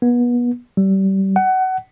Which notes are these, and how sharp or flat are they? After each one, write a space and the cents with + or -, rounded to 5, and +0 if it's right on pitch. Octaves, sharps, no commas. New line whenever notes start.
B3 -30
G3 -25
F#5 +25